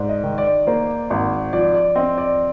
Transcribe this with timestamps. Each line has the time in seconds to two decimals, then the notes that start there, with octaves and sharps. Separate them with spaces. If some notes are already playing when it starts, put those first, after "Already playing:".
Already playing: G#2 D5
0.09 D#5
0.24 D#3
0.38 D5
0.67 A#3 C5
1.10 G#1
1.53 F3 D5
1.75 D5
1.96 C4 D#5
2.18 D5